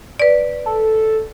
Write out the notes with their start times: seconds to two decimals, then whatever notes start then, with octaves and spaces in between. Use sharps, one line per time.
0.20 B4 D5
0.66 A4